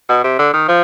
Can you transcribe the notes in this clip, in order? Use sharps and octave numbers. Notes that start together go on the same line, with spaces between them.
B2
C3
D3
D#3
F3